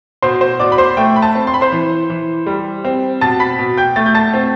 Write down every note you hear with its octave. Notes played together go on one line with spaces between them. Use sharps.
B2 C5 C6
C5 C6
B2 D5 D6
B5
C5 C6
A3 G5
B5
A5
C4
C6
B5
C5 C6
E3
E3
G3
C4
B2 A5 A6
B5 B6
B2
G5 G6
A3 A6
G6
A5 A6
C4